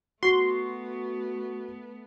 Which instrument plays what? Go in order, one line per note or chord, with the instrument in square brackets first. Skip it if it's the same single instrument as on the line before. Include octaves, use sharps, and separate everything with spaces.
[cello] A3 B3 [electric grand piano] F#4 [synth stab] C6